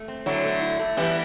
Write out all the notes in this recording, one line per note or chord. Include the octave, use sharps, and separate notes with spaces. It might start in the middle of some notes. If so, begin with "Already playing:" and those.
Already playing: A3
C4
D3 F#3 E4
A3
E4
A3
E3 G3 B3